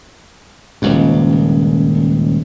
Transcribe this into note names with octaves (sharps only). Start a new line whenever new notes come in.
D#1 C#2 G2